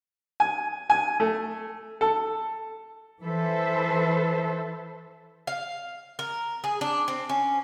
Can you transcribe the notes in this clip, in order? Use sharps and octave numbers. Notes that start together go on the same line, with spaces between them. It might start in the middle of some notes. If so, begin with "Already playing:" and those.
G#5
G#5
A3
A4
E3 A4 B4 C5 E5
F5
A#4
G#4
D4
C4
C#4